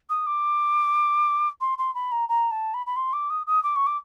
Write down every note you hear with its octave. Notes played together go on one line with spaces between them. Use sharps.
D#6
D6
C6
C6
B5
A#5
A#5
A5
B5
B5
C6
D6
D#6
D#6
D6
C#6
D6